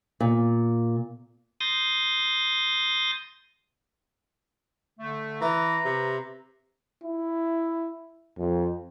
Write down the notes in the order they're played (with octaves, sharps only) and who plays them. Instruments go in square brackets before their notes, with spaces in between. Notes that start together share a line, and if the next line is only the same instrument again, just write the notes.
[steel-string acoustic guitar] A#2
[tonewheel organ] C6 D#6 G6 A6 A#6
[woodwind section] D3 A3
[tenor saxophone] E3 [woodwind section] B4 A#5
[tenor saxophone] C3
[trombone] E4
F2